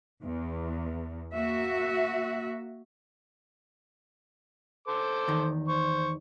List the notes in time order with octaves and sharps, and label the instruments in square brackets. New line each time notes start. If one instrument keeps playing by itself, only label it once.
[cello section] E2
A#3 F#4 E5
[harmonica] A4 C5 D6
[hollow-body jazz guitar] E2 D#3
[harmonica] C5 C#6